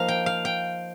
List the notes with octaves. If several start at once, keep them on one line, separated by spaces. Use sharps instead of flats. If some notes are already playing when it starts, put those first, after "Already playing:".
Already playing: F3 A#3 D#4 F5
G5
F5
G5